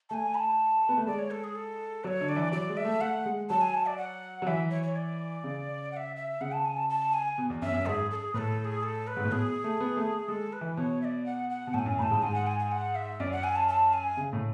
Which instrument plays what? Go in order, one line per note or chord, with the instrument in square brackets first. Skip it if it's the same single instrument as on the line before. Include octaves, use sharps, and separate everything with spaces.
[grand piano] A3 [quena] G#5 A5
[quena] B5
A5
[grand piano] B3
A3
[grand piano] G#3 [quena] D5
[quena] C#5
A4
G#4
A4
[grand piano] F#3 [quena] C#5 D5
[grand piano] D3
[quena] D5
[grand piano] E3
[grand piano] F#3 [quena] D5
[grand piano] G#3
[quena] E5
[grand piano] A3
[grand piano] A3 [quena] F#5
[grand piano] G#3
[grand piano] F#3 [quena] A5
[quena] G#5
A5
D5
F#5
[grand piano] F#3
[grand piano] E3 [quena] E5
[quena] C#5
C#5
D5
[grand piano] C#3
[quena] F#5
E5
E5
[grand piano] C#3 [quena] F#5
[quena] A5
G#5
A5
A5
G#5
[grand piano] B2
E2
[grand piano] F#2 [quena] E5
[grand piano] F#2
[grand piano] G#2 [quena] G#4 A4
[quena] A4
G#4
[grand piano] A2 [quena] B4
[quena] A4
A4
G#4
A4
B4
[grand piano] G#2
A2
[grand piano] B2 [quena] G#4
[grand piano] A3
B3
A3
[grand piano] G#3 [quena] A4
[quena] B4
[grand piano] E3
[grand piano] B2 [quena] C#5
[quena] E5
D5
F#5
F#5
[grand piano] B2
[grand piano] A2 [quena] A5
[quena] G#5
[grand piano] F#2
[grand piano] A2 [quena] A5 B5
[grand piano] G#2
[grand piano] G#2 [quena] G#5
[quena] F#5
G#5
G#5
F#5
E5
[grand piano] F#2 [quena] D5
[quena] F#5
G#5
A5
A5
G#5
[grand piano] C#3
A2